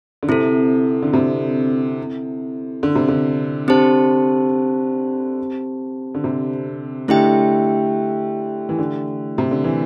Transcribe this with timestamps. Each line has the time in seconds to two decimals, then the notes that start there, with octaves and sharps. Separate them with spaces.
0.23 D3
0.28 C3 C4 E4 A4
1.03 D3
1.13 C3
2.83 D3
2.95 C3
3.08 D3
3.68 D3 C4 G4 C5 A5
6.15 D3
6.24 C3
7.08 D3 A3 E4 G4 E5 G5
8.69 E3
8.79 D3
9.38 C3
9.51 D3
9.64 E3